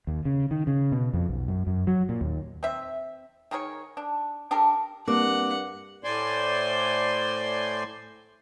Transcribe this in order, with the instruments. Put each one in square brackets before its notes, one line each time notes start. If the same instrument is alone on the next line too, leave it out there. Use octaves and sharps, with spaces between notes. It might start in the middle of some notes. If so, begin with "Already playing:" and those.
[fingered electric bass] D#2
C#3
D#3
C#3
B2
F2
B1
F#2
F#2
F#3
A#2
D#2
[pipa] C4 E5
D#3 G#4 A#4 C#5
D4
D4 G4 A4 A#4
[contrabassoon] G2 [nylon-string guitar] A#3 [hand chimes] C4 D6 [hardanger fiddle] F#5
[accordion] A2 C5 D5 G#5 C6